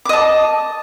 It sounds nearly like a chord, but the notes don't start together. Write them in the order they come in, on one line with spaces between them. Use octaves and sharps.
D6 D#5 A5